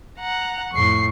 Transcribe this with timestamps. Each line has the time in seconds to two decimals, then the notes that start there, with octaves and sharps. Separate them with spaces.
0.19 F#5 A#5
0.73 F2 A2 C#6 C7